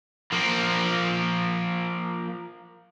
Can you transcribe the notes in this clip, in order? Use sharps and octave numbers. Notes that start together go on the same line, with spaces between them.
F3 A#3